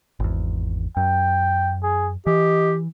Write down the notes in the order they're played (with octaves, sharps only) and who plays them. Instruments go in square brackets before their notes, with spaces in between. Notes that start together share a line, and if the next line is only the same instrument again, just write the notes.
[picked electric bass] G#1 E2
[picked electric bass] F#2 [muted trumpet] G5
[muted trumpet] G#4
[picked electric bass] E3 [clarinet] G4 [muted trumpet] D#5